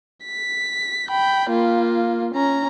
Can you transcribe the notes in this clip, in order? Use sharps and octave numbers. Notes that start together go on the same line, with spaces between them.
B6
G5 B5
A#3 F4
C#4 A#5